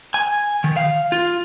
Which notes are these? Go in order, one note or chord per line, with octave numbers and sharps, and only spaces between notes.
G#5
D#3
F5
F4